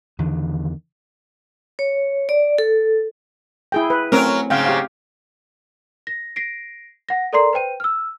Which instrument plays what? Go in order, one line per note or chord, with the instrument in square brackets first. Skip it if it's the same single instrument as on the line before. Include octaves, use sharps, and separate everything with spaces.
[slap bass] E2 D3 D#3
[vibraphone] C#5
D5
A4
[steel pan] E4 G#4 G5
B4
[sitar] F#3 A#4 [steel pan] A3 C4 C#4
[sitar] G#2 C#3 F#3 [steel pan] F5 G5
[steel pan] G4 F5
[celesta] A#6
A#6 C7 D7
F#5 A#6
A4 A#4 D5 A#5 C6 C7
B4 C5 G5 D#7
E6 F6